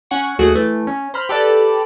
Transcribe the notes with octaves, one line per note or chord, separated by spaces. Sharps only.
C#4 F#5 C#6
D#2 A3 F#4 G#4
E3 A3
C#4
C5 A#5 B5 F6 G6
G4 A4 B4 D5